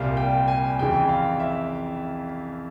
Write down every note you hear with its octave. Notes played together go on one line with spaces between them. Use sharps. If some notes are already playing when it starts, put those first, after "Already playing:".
Already playing: C2 A#2 G3 F5
G5
G#5
F2 C#3 E3 G5
F5
E5